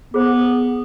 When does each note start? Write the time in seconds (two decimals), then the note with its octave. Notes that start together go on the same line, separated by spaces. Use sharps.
0.14 B3 G#4 C5